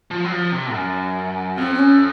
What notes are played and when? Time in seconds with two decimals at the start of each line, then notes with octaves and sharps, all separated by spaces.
0.11 F3
0.24 F#3
0.32 F3
0.52 C3
0.73 F#2
1.57 F2 C4
1.75 C4
1.79 C#4